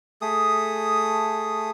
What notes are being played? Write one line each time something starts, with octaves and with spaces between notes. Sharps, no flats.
A3 G#4 D#6